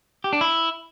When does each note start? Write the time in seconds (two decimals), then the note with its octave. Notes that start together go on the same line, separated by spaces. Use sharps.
0.24 G4
0.33 D4
0.41 E4